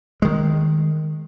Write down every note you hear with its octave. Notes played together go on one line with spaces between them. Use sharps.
D#3 G#3